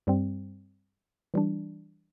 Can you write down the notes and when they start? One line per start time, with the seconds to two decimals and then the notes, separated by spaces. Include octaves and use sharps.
0.07 G2 G3 C4
1.34 E3 G3 D4